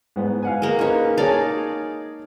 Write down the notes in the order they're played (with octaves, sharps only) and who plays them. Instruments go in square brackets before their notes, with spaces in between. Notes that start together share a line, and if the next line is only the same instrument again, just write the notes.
[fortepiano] G#2 B3
F5 F#5 G#5
[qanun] G#3 A#3
[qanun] C#4 C#5 [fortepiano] D#4 B4
[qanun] D#4 D5 F5 [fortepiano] G#4 C#5 A5